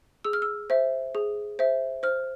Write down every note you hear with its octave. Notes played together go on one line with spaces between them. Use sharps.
G#4 E6
F6
E6
C5 E5
G#4
C5 E5
C5 F6